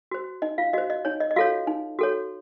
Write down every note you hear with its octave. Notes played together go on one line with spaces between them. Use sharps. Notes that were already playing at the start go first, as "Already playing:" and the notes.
F#4 C5
D#4 D#5
F4 F5
F#4 C5 D#5
D#5
D#4 C#5
D#5
D#5
F4 F#4 A4 C#5 F5
D#4
F#4 A4 C#5